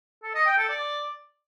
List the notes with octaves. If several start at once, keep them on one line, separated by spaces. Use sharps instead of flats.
A4
D#5
G5
A4
D5